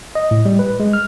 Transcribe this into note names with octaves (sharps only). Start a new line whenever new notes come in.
D#5
A2
G3
B4
G#3
F6